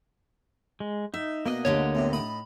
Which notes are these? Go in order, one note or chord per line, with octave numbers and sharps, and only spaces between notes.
G#3
D#4 E5
B2 A#3 D4 D#4 D#5 F#5
D2 D3 G4 C#5
E2 A2 C3
A2 D#4 B5 D#6